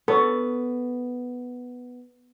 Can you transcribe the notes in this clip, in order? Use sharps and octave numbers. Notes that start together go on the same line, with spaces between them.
B3 A4 C#5